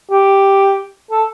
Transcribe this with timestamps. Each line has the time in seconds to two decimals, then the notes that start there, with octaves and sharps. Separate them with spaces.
0.10 G4
1.11 A4